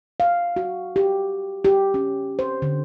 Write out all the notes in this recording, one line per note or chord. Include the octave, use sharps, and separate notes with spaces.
F5
F#4
G4
G4
C#4
C5
D3